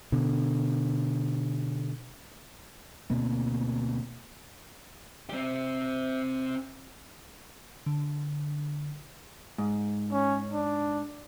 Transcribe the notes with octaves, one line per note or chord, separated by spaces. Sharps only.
B2 D3
D2 B2 A#3 C4
C4 G4
D3
G#2
C#4
D4